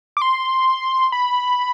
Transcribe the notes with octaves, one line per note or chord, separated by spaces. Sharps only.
D6
C6
B5